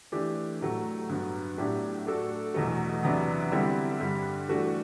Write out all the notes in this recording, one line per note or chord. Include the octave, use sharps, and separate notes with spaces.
E3 A3 D4 G4
A2 F#3 A3
G2 F#3 B3
A2 F#3 A3 D4 G4
A3 D4 F#4 A4
E2 B2 F#3 A3
E2 C3 F#3 B3 D4
D3 G3 C4 E4
G2 D3 G3
E3 A3 D4 F#4 A4